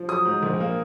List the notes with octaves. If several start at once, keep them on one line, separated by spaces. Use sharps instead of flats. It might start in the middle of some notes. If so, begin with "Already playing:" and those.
Already playing: F3
F#3 D#6
G#2
A#1
A#3